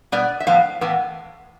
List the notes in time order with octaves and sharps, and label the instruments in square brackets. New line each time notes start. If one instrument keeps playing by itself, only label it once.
[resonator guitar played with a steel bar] B2 G3 B3 D5
E5
A2 F3 B3 F5
A2 E3 B3